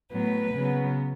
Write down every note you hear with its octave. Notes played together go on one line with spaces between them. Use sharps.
A2 F#3 B3 B4
C#3 F#3 B3